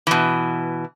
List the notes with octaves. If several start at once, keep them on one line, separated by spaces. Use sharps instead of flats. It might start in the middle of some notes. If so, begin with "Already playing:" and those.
B2 E3